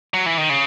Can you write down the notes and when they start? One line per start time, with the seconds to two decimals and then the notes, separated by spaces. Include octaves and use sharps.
0.14 F#3
0.26 E3
0.38 D#3
0.50 C#3